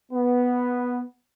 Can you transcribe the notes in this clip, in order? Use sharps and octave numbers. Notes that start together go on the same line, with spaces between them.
B3